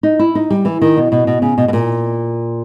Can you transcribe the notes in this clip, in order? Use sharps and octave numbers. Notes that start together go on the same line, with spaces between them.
D#4
E4
D#4
G3
E3
D#3
B2
B2
B2
C#3
B2
B2
A#2